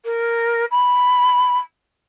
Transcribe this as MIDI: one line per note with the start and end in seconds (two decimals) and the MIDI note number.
0.05 0.65 70
0.71 1.58 83